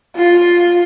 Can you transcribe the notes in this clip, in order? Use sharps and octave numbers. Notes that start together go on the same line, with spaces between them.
F4